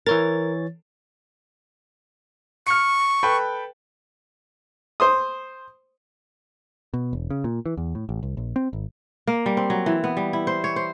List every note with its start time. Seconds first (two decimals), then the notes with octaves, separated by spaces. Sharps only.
0.07 E3 A#4 C#5 A6
2.67 C#6 F6 C#7
3.23 A4 B4 G5
5.00 C5 C6 D#6
6.94 B2
7.13 E1
7.30 C#3
7.44 A#2
7.66 E3
7.77 E2
7.95 A2
8.09 A1
8.23 C2
8.37 A#1
8.56 C4
8.73 G#1
9.27 A#3
9.46 G3
9.57 C4
9.70 F#3
9.86 E3
10.04 B3
10.17 G3
10.33 E4
10.47 C5
10.64 C#5
10.76 C5